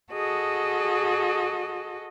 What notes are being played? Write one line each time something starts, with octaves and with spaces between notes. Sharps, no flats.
F#4 G#4 A4 D#5